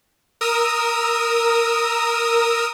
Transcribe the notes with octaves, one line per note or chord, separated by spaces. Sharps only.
A#4 D#6 E6